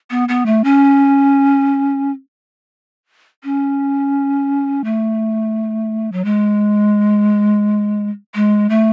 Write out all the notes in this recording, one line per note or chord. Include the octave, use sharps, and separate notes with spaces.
B3
B3
A3
C#4
C#4
A3
F#3
G#3
G#3
A3